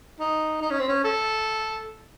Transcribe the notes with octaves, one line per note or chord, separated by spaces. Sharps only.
D#4
D#4
C#4
C4
C#4
A4